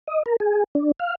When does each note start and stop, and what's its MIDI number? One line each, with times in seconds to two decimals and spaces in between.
0.07 0.23 75
0.26 0.36 70
0.40 0.64 68
0.75 0.92 62
1.00 1.15 77